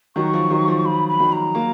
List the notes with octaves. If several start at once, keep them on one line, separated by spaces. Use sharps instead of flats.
D#3 F#3 C#6
F3
D#3 F#3
F3
F3 B5
B5
D#3 F#3
A#5
F#3 A#3